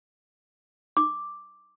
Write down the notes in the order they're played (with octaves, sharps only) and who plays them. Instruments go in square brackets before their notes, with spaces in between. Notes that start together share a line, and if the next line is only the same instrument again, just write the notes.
[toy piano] D6